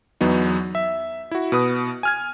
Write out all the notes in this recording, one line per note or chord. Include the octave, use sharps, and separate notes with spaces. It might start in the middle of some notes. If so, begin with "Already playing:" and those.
E2 F#3 B3 D#4
E5
E4 F#4
B2 B4 D#6
G#5 F6 G#6